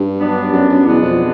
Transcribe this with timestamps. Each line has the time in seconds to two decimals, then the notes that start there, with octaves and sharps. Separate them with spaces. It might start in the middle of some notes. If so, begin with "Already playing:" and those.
Already playing: G2
0.20 F#3 B3 D4
0.52 F#2
0.69 F#2
0.86 E2 B2 G#3 B3 D4
1.02 F2